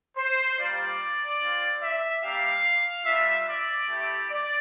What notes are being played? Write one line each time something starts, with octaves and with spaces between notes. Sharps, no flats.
C5
G3 A#3 F4 D5
C4 F4
E5
G3 A#3 D4 G4 F5
G3 D4 F4 E5
D5
A3 E4 G4
D5